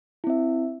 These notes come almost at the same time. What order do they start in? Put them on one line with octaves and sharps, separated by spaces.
E4 C4 E5